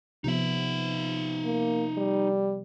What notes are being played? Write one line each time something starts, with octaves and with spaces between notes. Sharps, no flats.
C3 F3 B3 D#4 E5
A#3
G3